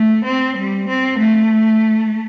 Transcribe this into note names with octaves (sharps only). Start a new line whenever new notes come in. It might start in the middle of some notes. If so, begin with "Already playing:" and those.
Already playing: A3
C4
G3
C4
A3